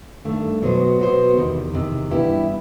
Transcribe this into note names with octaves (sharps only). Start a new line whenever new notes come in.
G2 D#3 A3
B2 F#3 B3 F#4 C5
B2 F#3 B3 F#4 C5
E2 C3 D#3
E2 C3 D#3
G2 E3 B3 E4 G4